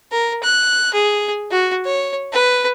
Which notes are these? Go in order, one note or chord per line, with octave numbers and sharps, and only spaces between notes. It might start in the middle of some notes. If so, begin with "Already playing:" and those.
A#4
F#6
G#4
F#4
C#5
B4